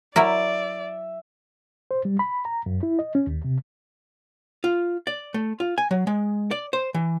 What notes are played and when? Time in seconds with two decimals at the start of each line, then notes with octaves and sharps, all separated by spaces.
0.16 F#3 E4 A#4 D5 E5
1.91 C5
2.05 G3
2.19 B5
2.45 A#5
2.66 F#2
2.83 E4
2.99 D#5
3.15 C#4
3.27 D#2
3.45 C3
4.64 F4
5.07 D5
5.34 A3
5.60 F4
5.78 G#5
5.91 F#3
6.07 G#3
6.51 D5
6.73 C5
6.94 E3